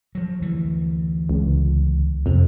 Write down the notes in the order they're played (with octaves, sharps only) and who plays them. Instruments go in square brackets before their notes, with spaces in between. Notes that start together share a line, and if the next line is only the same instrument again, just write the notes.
[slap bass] F3 F#3
D2 E3
[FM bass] C#2
[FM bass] F2 [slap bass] C3